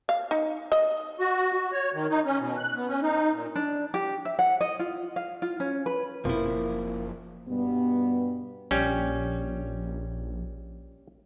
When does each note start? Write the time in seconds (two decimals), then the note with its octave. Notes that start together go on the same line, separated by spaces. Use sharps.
0.09 F5
0.31 D#4
0.72 D#5
1.20 F#4
1.52 F#4
1.73 C#5
1.94 D#3
2.10 D#4
2.26 C#4
2.39 B2
2.58 F#6
2.76 B3
2.88 C#4
3.02 D#4
3.33 A#2
3.56 D4
3.94 G4
4.25 E5
4.39 F#5
4.61 D#5
4.79 F4
5.16 F5
5.42 F4
5.60 C#4
5.86 B4
6.25 F#1 F2 B2 F3 A#3 C4 E4
7.48 G2 B2 G3 B3
8.71 A#1 G3 C#4